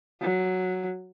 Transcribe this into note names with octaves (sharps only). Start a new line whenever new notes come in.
F#3